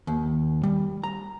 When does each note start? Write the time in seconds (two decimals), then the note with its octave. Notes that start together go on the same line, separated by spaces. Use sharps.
0.07 D#2
0.63 G3
1.04 A#5